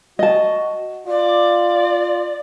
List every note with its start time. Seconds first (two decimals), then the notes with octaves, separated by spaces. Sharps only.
0.19 F#4 D#5 A5
1.07 F4 D5